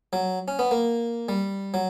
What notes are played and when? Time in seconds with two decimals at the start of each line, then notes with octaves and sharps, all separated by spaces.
0.13 F#3
0.48 C#4
0.59 B3
0.71 A#3
1.29 G3
1.74 F#3